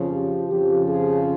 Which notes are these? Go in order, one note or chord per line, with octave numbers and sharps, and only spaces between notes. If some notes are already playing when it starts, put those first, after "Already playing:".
Already playing: F2 C#3 F3
G4
F2 C#3 F3 G4
G#4